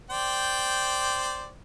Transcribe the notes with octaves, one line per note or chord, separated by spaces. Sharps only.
C5 D5 G5